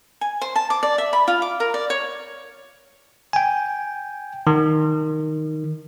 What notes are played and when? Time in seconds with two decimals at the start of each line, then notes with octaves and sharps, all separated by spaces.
0.21 G#5
0.42 C5
0.56 A5
0.70 D6
0.83 D5
0.98 E5
1.13 B5
1.28 F4
1.42 D6
1.60 A#4
1.74 D5
1.90 C#5
3.33 G5 G#5
4.47 D#3